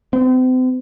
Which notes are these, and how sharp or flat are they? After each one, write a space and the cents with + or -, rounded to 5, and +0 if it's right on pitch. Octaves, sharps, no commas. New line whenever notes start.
C4 -40